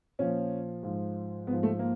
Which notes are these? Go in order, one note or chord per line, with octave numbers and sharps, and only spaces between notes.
A#2 F3 C#4
G#2 F3
G#2 F3 B3
A3
A#3